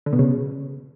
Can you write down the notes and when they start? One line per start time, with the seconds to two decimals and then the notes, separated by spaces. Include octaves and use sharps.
0.06 D3
0.13 B2
0.19 C#3